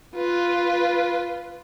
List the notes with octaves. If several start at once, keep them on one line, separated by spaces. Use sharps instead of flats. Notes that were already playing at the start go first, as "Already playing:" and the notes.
F4 B4